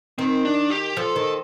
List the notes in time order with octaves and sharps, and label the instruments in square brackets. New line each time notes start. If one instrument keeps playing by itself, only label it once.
[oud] D#3 [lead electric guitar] C4
[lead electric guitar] D4
G4
[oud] F3 [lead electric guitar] A4
[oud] D#3